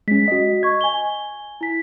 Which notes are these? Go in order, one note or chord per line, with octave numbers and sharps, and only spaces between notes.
G#3 C#4 B6
F#4 D#5
D#5 C#6 G#6
G#5 G7
E4 B6